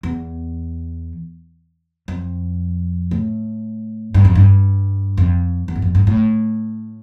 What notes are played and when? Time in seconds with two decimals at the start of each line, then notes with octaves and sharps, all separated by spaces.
0.03 E2
2.08 F2
3.11 A2
4.14 G2
4.25 F2
4.35 G2
5.17 F2
5.68 E2
5.75 G2
5.82 F2
5.95 G2
6.07 A2